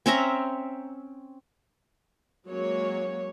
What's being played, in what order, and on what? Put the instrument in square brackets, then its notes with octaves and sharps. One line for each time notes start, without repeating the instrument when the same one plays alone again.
[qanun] C4 C#4 E5 A#5
[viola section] F#3 G#3 A#3 C#4 C#5